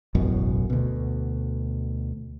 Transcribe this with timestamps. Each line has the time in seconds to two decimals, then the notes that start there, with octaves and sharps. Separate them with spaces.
0.15 E1 A1 F#2 B2
0.70 D2 B2